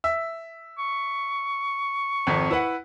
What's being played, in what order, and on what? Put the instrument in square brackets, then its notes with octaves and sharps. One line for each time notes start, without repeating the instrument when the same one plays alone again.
[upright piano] E5
[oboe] C#6
[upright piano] G#1 F2
E4 B4 F#5